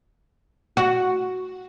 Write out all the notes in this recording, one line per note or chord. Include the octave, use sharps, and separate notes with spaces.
F#4